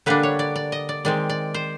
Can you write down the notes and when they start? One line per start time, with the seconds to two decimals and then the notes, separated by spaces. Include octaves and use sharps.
0.06 D3 G3 A#3 D4 B4
0.23 C#5
0.39 D5
0.56 D5
0.72 D#5
0.89 D5
1.05 D#3 G#3 C4 D5
1.30 D5
1.54 C5